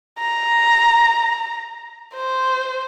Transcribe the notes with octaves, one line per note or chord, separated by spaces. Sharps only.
A#5
C5